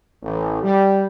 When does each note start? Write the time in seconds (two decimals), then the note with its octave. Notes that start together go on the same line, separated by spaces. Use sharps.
0.23 A1
0.63 G3